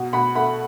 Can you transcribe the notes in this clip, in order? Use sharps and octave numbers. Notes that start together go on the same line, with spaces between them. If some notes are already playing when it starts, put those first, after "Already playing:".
Already playing: B2
B2 F#5 B5
A3 F#5 B5